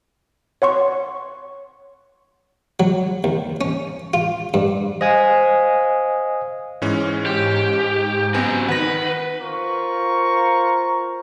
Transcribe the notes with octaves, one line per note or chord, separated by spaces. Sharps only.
C#5 F#5 C6 C#6
F#3
D#2
C#4
F4
G2
C5 D#5 F5 G#5 D#6
G#2 E3 G#3 C#4
G4
C#3 F#3 B3 C4 G#5
D#3 B4 F#5 A#6
F4 A#4 C5 A#5 C#6